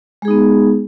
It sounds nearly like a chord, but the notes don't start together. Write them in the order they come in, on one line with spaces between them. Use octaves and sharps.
G#3 G#4 D#4 B3